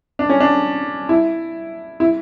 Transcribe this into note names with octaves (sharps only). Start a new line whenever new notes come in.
D4
C#4
D4
E4
E4